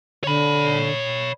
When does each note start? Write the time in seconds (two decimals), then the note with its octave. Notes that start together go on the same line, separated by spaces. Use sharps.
0.24 D3 C#5 B5